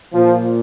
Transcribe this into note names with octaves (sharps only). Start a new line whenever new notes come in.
A#2 F3